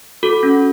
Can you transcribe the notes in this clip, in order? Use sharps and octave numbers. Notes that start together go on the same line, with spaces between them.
F#4 A4
C#4